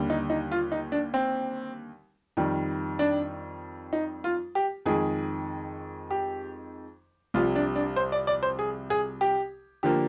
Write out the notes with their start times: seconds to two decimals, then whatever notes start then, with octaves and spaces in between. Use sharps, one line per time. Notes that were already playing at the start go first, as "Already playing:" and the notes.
Already playing: D#2 D3 G3
0.10 D#4
0.30 D#4
0.52 F4
0.72 D#4
0.92 D4
1.14 C4
2.37 F2 D#3 G3
2.99 D4
3.93 D#4
4.24 F4
4.55 G4
4.86 F2 D#3 G#3 G#4
6.11 G4
7.34 C2 C3 F3 F4
7.56 D4
7.76 D4
7.96 C5
8.12 D5
8.27 D5
8.43 C5
8.59 G#4
8.90 G#4
9.21 G4
9.83 D3 F3 A#3 G4